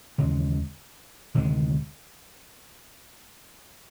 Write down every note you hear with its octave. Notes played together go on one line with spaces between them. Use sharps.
D#2 C#3 E3 G#3
D2 C3 D#3 G#3